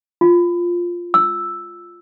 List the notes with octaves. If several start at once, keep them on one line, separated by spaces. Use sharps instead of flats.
F4
E6